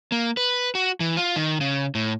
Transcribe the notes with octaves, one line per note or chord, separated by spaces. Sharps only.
A#3
B4
F#4
E3
F4
D#3
C#3
A2